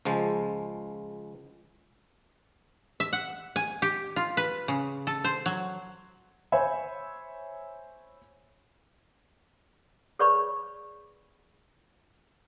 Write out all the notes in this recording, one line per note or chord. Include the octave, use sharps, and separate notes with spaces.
C#2 F3 G#3 A5
E5
F#5
G#5
G4
F4
B4
C#3
A4
C5
F#3
C5 C#5 E5 G#5 B5
G#4 B4 C#5 D5 B5 C#6